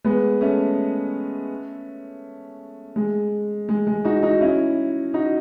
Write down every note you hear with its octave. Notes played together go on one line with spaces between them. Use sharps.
G#3 B3
A3 C#4
G#3
G#3
G#3
D#4 F#4
D#4 F#4
C#4 E4
D#4 F#4